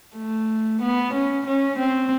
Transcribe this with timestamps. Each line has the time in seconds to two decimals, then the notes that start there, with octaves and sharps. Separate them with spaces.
0.16 A3
0.82 B3
1.14 C#4
1.47 C#4
1.78 C4